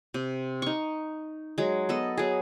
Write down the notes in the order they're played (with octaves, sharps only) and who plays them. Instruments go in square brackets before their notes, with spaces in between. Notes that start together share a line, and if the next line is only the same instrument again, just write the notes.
[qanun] C3
D#4 C#6
F#3 G#3
B3 A4 D#5
F#3 G#4